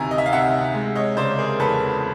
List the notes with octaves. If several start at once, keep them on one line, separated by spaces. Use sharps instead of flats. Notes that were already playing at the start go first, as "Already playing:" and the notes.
Already playing: D2 C3 D#3 G#5 A#5
D#5
E5
F5
C3 E5 F#5
G#3
C#5 D#5
C#3 C5 D5
G#4 A#4
E2 A4 B4